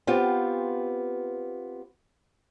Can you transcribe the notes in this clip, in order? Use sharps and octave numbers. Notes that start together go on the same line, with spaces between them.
B3 C4 F4 G4